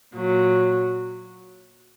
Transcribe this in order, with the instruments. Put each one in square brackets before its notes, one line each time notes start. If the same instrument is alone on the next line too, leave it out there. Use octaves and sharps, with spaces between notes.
[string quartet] A#2 F#3